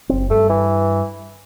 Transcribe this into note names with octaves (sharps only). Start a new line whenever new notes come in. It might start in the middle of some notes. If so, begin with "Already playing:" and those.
F#1 C4
G2 A3
E3